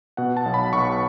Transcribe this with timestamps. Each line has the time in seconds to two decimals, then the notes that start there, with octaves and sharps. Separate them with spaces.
0.17 B2 F#5
0.37 A5
0.46 B1
0.54 B5
0.73 B1 C#6